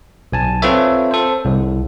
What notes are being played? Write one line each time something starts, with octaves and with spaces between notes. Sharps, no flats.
B1 G#5 A5
C4 F4 A4 B4 C#5 E5
A4 C5
C2